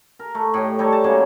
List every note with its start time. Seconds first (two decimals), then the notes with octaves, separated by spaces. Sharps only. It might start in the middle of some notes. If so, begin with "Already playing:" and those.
0.19 A#4
0.35 A3
0.54 A2 G4 D#5
0.79 G3 D#4 A4 C#5
0.92 A5
1.04 C#3 F#3 G#3 A#3